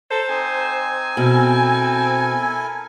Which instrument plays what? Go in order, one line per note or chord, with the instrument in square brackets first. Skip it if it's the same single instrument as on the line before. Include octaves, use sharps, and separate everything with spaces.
[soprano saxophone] A4 [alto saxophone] C5 [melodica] A#5
[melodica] C4 D#4 [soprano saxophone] G#5
[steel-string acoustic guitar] B2 [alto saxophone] C4 [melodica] E4 A4 A#4